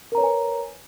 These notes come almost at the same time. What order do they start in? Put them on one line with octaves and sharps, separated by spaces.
A#4 A#5 C#5 B4 G#5